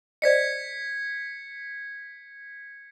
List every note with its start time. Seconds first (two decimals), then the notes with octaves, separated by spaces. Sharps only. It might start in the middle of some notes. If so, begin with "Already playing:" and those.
0.22 C5 D5 D#5 G#6 B6 C#7